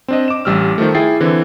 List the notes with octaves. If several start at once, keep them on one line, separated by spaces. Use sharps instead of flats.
C4 D4 D#5
D6 E7
A1 G3 E6 F6
D#3 F3 A3
E4 G#4 G5 A6 C7
D3 E3 C4